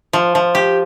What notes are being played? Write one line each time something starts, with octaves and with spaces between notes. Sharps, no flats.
F3
F3
G4